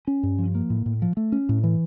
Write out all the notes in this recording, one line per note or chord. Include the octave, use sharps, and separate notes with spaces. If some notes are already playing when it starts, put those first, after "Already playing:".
C#4
G2
F3
A#3
A2
A2
F3
A3
C#4
A2
E3